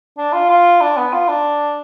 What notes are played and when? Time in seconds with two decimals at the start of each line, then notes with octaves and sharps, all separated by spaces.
0.18 D4
0.33 F4
0.49 F4
0.81 D4
0.97 B3
1.13 F4
1.29 D4